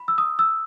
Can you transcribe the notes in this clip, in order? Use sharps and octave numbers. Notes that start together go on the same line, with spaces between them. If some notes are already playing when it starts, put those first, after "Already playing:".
Already playing: B5
E6
D#6
E6